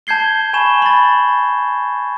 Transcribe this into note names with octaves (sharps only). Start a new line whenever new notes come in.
A5 G6 G#6 C7 G7
G#5 B5 C#6 E7 G7
B5 A6